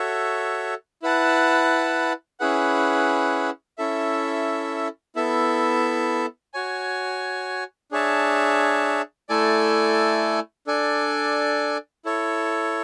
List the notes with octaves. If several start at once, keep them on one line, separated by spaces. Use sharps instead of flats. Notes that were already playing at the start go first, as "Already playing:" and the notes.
Already playing: F#4 A4 C#5 E5
E4 B4 F#5 A5
C#4 E4 G#4 B4 F#5
C#4 E4 A4 E5
B3 E4 A4 E5
F#4 C#5 G#5
D4 G#4 C#5 E5 A5
A3 E4 A4 D5 G#5
D4 A4 D5 G#5
E4 A4 C#5